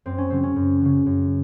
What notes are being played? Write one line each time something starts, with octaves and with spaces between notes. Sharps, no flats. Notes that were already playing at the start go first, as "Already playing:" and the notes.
F#2 C4
C#4
C#3 F#3 C4
C#4
F#2
C#3 F#3
F#2